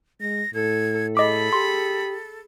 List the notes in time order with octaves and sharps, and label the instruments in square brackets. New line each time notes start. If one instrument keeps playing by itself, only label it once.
[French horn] G#3 [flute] A#6
[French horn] A2 [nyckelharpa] A4 [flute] G#6
[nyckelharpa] G#4 B5 [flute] A4 [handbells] D#5 D6
[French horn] G4 [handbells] C6